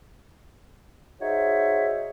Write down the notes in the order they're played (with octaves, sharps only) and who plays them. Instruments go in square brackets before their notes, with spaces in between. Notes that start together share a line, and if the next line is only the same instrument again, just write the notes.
[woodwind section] D#4 F#4 G#4 C5 C#5 E5